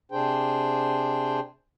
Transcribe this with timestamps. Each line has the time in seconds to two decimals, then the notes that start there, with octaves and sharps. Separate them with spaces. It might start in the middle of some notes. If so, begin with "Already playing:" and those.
0.12 C3 D4 G#4 C5 G5